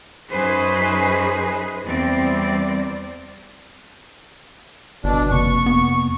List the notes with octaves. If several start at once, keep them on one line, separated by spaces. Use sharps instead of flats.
F#2 D#4 G#4 B4 C5
E2 G3 C4 D5
G1 B2 D4
F2 C3 A#3 C#6
B3